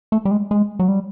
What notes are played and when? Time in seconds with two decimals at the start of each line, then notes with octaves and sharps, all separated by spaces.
0.12 A3
0.25 G3
0.31 G#3
0.51 G#3
0.79 F#3
0.88 G3